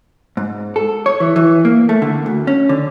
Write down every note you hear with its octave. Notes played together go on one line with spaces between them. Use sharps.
G#2
A4
C#5
E3
E3
A#3
A3
D3
D2
C#4
D3